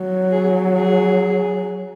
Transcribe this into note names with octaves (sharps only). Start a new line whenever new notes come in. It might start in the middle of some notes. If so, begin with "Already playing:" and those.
Already playing: F#3
G#4
G#4